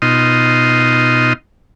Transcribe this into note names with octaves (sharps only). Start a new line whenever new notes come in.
B2 D#4 F4 D#5 C6